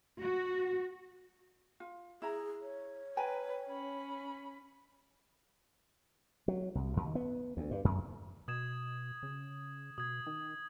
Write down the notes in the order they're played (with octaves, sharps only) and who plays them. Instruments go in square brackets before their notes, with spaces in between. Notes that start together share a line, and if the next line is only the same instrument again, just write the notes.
[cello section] F#4
[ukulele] F4
[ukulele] E4 A#5 [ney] G#4
[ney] C#5
[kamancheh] B4 [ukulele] G5 G#5 A#5
[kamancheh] C#4 B5
[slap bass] F#3
C2
D#2
B3
D2
G2
F#2
[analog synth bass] B2 [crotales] D#6 G#6 E7
[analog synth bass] C#3
[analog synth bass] B2 [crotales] D#6 G#6
[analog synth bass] D#3